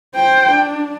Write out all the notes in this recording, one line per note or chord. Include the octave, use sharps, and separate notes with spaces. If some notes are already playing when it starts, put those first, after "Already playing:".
C5 G5
D4